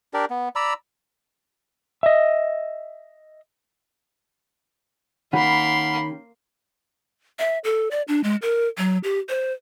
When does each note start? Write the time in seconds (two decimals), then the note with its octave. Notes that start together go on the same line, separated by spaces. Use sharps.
0.14 D4 G4 A#4 D5
0.30 B3
0.56 D5 A#5 B5 E6
2.03 D#5 E5
5.33 D#3 A#3 C#4 G4 F#5 B5 C6
7.39 E5
7.64 A4
7.91 D5
8.08 D4
8.24 G#3
8.42 A#4
8.78 F#3
9.04 G4
9.29 C5